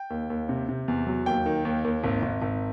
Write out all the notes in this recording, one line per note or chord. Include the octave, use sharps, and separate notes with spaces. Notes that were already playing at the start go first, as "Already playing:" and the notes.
Already playing: G5
D#2
D#2
C3
C3
E2
F#3
D#2 G5
D#3
D#2
D#2
G#1
G#1
G#1